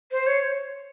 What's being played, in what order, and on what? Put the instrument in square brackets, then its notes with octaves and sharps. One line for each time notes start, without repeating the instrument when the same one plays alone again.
[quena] C5
C#5